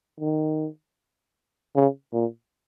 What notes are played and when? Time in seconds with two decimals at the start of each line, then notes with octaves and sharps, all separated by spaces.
0.20 D#3
1.75 C#3
2.13 A#2